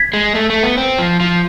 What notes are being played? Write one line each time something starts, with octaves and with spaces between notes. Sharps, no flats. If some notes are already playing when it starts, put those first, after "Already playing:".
Already playing: G#6 B6
G#3
A3
A3
B3
C4
F3
F3